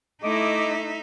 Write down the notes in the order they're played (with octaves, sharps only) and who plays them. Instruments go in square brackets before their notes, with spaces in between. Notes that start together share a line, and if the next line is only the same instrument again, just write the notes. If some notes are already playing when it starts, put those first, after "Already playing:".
[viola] A3 E4 [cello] D#4 E5 [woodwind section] D#5 D6